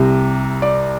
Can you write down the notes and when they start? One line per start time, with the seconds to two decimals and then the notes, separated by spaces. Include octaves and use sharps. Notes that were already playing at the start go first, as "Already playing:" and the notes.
Already playing: C2 C3 G3
0.62 D5